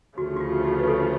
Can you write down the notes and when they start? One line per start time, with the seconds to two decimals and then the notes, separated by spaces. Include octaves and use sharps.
0.17 D2 C#3 F3 A3 F#4
0.37 F#4
0.40 F4
0.65 F#4
0.80 B4
0.88 A4